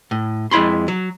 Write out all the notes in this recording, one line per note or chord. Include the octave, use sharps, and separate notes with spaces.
A2
F2 G#3 E4 B5 C6
F#3